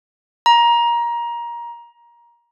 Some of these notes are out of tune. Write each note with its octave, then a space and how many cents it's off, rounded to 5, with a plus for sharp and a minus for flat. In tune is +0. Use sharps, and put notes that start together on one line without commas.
A#5 +20